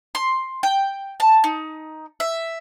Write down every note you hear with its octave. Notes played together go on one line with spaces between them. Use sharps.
C6
G5
A5
D#4
E5